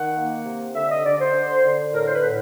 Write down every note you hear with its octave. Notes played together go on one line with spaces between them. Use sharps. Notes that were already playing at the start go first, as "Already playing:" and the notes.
Already playing: D#3 F#5
A#3
C3
D3 E5
D#5
D3 D5
C5
D3
D3
A2 A#4
C5
B4
A2